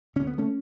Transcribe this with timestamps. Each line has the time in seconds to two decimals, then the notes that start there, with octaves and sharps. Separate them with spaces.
0.16 D2 D3 C#4
0.27 B3
0.38 A3 C#4